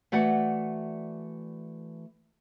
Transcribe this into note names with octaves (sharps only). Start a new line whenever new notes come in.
E3 A3 F#4 D5 F#5